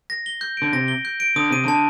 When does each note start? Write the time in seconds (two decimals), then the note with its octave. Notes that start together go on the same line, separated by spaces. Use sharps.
0.10 A#6
0.26 G7
0.41 G6
0.57 D3 D7
0.73 C3 A#6
0.88 G7
1.05 G6
1.20 D7
1.36 D3 D#6
1.51 C3 D#7
1.64 D3 A5